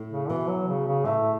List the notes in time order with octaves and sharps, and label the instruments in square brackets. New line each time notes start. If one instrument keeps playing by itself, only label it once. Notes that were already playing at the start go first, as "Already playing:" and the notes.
Already playing: [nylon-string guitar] A2
[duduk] C#3
[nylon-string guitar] B2 [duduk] E3
[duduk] F#3
C#3
C#3
[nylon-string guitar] A2 [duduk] A3